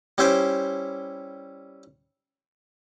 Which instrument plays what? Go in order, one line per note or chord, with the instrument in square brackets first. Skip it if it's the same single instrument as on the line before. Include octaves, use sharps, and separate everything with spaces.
[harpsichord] G3 C#4 E4 C5 G5